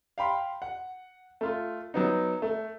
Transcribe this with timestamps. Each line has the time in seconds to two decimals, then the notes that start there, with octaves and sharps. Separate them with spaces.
0.18 F5 G5 B5 C6
0.62 F#5
1.41 A3 F4
1.94 F#3 B3 D#4
2.42 A3